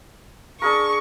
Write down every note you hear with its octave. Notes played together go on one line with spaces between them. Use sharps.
D4 G#4 A#4 C#6